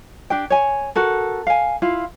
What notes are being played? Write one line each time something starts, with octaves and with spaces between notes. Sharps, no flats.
D4 G4 G5
C#5 G#5
F#4 A4 A#4
F5 G#5
E4 F4 F5